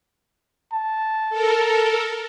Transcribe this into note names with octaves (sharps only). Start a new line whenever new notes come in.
A5
A4 A#4